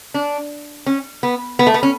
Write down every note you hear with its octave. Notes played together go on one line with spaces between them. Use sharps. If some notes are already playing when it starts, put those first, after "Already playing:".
D4
C#4
B3
B3
A3
B3
C#4